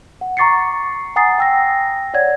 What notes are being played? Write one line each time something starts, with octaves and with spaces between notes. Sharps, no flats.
F#5
A#5 C#6 D6 A6 C7 C#7
F#5 G#5 A#5 D#6 A6 C7
G5 E6 A#6
C#5 D5 F#5 G#6